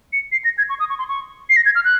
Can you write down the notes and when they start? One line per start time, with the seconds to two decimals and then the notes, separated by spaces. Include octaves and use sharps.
0.13 C#7
0.32 C7
0.44 A#6
0.58 G#6
0.69 C#6
0.80 D#6
0.90 C#6
0.99 C6
1.09 C#6
1.50 C7
1.56 A#6
1.66 G#6
1.75 F6
1.85 F#6